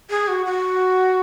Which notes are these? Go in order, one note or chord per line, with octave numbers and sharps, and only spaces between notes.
G#4
F#4
F#4